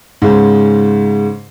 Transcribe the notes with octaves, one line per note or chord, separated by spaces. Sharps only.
G#2 C#3